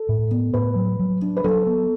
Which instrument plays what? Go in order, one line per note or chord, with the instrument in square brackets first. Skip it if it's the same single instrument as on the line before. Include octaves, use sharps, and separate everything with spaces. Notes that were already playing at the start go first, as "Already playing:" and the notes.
Already playing: [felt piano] A4
[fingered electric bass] A2
B3
[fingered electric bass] A2 [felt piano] B4
[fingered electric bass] F#3
F#3
D4
[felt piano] B4
[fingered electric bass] F#3 [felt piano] A4
[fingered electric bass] B3